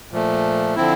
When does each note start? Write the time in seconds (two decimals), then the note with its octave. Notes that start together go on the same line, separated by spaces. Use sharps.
0.11 A#2 F3 A3
0.76 D3 F3 C4 E4